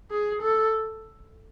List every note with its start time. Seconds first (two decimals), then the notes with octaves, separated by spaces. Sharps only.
0.11 G#4
0.43 A4